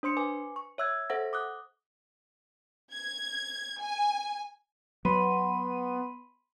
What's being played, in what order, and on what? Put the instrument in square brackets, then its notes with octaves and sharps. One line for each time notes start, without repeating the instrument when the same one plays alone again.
[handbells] D4 C5 C6 C#7
B4 G#5 D6
C#6
C#5 E5 E6 F#6 G#6
A4 C5 E5 F#5 A#6
D6 D#6 F#6
[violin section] G#6
G#5
[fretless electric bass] F#3 [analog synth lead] B3 [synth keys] B5 C6 D#7